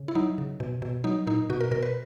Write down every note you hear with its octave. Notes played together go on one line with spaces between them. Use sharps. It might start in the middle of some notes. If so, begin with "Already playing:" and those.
Already playing: C#3
E4
F#3 D#4
C#3
B2
B2
F#3 D#4
A#2 D#4
B2 F#4
A#4
B2 A#4
B4